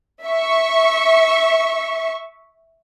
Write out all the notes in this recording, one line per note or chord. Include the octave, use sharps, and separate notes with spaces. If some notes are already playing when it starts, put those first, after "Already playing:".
E5 C#6